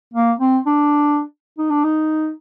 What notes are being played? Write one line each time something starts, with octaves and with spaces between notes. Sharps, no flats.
A#3
C4
D4
D#4
D4
D#4